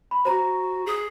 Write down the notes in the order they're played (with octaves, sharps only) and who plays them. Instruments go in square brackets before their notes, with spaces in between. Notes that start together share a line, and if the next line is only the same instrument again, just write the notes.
[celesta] B5
[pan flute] F#4 [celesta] C5 A#5
[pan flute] G#4